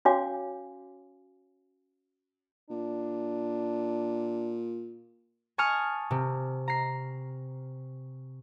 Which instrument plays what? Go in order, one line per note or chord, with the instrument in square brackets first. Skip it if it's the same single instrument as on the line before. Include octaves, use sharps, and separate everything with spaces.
[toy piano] C#4 F#4 C#5 F5 G#5 D6
[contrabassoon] A#2 [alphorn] D4
[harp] G#5 A5 C#6 D#6 F6
C3
A#5 C7